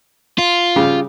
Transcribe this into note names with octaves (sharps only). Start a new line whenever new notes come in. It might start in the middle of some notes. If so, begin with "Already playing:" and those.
F4
C#3 G3 G4